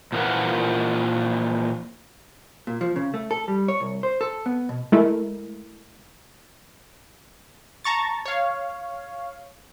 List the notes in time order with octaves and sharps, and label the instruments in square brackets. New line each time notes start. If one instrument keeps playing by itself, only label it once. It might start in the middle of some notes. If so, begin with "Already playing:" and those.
[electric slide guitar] A#2 E3 F3 A#3 A#4 F#5
[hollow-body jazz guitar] A#2
F3
C#3
A3
A4
G3
C#5
C2
C5
A4
B3
B2
[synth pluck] G#3 A3 E4 A#4
[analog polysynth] A5 A#5 C#6 A6
C#5 F5